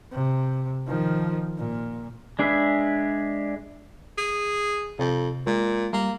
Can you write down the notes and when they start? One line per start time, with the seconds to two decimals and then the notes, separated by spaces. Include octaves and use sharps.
0.12 C3
0.87 D#3 F3
1.58 A#2
2.39 G#3 D4 G#4 B4 E5
4.18 G#4
4.99 F2 C3
5.47 A#2 G#3
5.93 G3 A#3